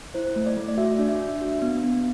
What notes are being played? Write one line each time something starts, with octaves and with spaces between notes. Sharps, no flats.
E4 C5
A3
D5
A3
D5
F#4 E5
D4 D5
E5
D4
F#4
B3
B3